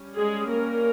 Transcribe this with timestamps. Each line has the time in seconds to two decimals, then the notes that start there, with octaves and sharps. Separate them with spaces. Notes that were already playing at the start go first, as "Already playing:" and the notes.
Already playing: G3 C#4
0.15 G#3 G#4
0.48 A#3 A#4